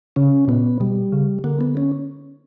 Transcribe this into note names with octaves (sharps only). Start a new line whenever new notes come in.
C#3 C#4
A#2 B3
B2 G3
C#3
D3 A#3
B3
C#4